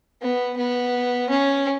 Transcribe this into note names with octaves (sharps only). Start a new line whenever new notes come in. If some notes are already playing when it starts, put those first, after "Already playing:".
B3
B3
C#4